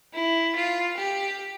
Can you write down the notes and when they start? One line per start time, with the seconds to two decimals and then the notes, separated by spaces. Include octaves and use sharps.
0.13 E4
0.55 F4
0.97 G4